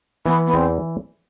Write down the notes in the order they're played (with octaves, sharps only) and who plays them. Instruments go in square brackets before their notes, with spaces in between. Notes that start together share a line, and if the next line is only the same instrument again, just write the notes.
[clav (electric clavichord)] E3 [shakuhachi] B3
[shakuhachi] B3
[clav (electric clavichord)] E2 [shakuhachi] C4